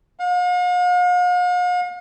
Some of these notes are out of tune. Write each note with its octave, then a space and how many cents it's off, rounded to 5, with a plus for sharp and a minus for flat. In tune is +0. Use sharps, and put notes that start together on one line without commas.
F5 +45